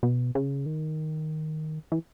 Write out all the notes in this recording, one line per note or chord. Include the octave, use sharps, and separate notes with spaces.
B2
C#3
D#3
E3